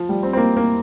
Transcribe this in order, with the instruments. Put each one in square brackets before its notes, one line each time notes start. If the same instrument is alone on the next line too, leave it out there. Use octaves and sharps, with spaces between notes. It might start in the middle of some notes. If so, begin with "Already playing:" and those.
Already playing: [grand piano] F3
G3
C4
C4
A#3
A#3